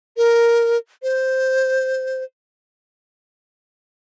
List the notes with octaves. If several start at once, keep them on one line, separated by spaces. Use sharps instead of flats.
A#4
C5